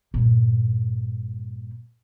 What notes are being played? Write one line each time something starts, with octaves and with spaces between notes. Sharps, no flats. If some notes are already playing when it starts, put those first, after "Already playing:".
G2 A#2